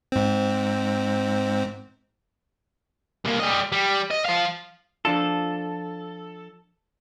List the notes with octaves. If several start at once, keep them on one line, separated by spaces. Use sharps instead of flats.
G#2 C4
C2 A#3
G3 D#5
G3
D#5
F3 F5
F3 D4 F4 A4